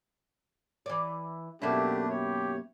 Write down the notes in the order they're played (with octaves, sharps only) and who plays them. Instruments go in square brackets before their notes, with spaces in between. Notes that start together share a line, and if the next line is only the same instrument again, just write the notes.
[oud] E3 D5
[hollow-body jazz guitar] F#2 B2 [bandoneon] A3 D4 [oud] A#3 E4 [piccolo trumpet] G4
[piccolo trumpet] G4 [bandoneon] C#5